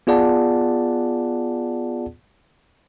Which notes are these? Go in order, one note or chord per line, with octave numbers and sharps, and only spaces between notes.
B3 F4 G#4 D5 F#5 A5